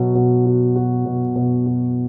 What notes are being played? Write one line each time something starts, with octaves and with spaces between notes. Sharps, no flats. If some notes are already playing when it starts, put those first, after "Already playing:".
Already playing: B2 F#3 B3
B2
F#4
F#4
B2
B2
F#4